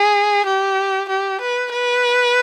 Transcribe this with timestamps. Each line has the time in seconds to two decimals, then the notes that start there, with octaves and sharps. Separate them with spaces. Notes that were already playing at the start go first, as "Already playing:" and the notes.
Already playing: G#4
0.46 G4
1.09 G4
1.41 B4
1.72 B4